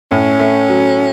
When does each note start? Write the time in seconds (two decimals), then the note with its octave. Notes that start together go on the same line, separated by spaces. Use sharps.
0.11 A2 C#4
0.40 A3
0.69 F#3